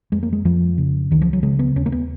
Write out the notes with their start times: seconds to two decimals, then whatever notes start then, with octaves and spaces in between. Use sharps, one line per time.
0.12 F2 G#3
0.23 A#3
0.33 G#3
0.45 F2 F3
0.78 C#3
1.11 C#2 D#3
1.22 F3
1.33 F#3
1.43 C#3 G#3
1.59 B3
1.76 D#2 C#4
1.86 A#3
1.92 B3